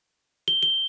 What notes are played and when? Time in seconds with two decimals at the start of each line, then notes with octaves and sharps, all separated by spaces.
0.48 G7
0.63 G7